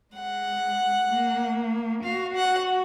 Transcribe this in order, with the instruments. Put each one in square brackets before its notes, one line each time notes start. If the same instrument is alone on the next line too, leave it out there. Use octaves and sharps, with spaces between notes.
[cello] G#3 [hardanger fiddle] F#5
[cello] A#3
[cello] F#4 [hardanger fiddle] F5
[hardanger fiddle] F#5